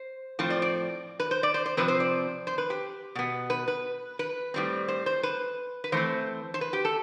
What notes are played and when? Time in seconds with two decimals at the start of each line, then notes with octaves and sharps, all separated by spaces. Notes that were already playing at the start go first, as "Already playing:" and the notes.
Already playing: C5
0.39 A2 F3 C4
0.50 D5
0.62 D5
1.20 B4
1.31 C5
1.43 D5
1.54 C5
1.66 C5
1.77 C3 F3 C4 B4
1.88 C5
2.00 D5
2.47 C5
2.58 B4
2.70 G4
3.15 B2 B3
3.50 B4
3.68 B4
4.19 B4
4.54 A2 G3 C4
4.88 C5
5.06 C5
5.23 B4
5.84 B4
5.92 E3 A3 C4 C5
6.54 C5
6.61 B4
6.73 G4
6.85 A4